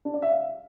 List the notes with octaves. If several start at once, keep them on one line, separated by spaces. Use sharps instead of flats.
D4
D5
E5
F5